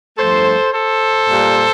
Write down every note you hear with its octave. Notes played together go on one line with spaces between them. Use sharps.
G2 F3 A3 A4 C5
A4 C5
A#2 G3